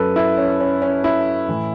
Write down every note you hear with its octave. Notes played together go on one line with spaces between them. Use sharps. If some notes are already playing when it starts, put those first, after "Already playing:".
Already playing: F#2 F#3 A4 B4
E4
C#4
C#4
C#4
E4
A2 E3